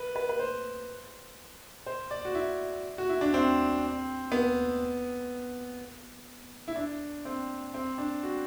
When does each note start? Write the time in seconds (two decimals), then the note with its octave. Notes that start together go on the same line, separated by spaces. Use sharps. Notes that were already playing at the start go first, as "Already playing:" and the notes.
Already playing: B4
0.16 B4
0.29 B4
0.39 C5
1.86 C5
2.11 D5
2.25 F#4
2.35 E4
2.98 F#4
3.09 E4
3.21 D4
3.34 C4
4.32 B3
6.68 E4
6.76 D4
7.25 C4
7.74 C4
7.98 D4
8.23 F#4